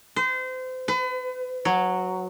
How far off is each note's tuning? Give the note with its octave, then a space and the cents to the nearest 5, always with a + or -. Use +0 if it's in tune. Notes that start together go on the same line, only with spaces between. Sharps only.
C5 -30
B4 +40
F#3 -5